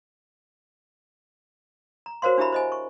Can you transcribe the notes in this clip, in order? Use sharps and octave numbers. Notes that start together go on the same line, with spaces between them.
A#5
F#4 A#4 C5 C#5 F5 C6
D4 E4 G4 E5 A#5 B5
C5 D#5 G#5
C#6